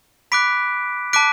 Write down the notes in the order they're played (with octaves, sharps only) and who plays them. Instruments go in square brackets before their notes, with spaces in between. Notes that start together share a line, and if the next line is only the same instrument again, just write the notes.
[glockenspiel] B5 D6 F#6 B6 D7
A5 D6 F#6 B6 D7